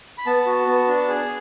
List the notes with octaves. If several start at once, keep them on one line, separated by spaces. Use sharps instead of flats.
B5
B3 A5
F#4
B3
D4
G#4